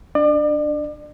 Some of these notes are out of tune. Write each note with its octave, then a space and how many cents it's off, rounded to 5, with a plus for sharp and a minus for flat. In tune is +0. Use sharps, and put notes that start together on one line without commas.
D4 +0 D5 +35